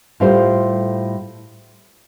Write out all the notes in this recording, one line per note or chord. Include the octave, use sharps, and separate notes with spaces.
A2 G3 F4 C5